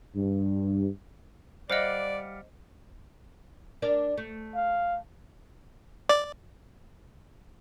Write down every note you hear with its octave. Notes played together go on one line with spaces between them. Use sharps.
G2
G3 C5 D5 D#5 F5 F#5
D4 A#4 D5
A3
F5
D5